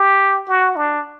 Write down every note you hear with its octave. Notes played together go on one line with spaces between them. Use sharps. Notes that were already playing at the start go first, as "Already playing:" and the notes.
Already playing: G4
F#4
D4